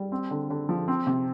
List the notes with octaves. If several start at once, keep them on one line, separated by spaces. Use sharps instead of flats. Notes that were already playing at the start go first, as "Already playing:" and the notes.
Already playing: G3
C4
D3
D3
F3
C4
C3